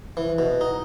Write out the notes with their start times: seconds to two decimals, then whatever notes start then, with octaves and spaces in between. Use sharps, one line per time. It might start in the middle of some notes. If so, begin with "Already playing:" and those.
0.17 E3
0.38 B2
0.61 D#4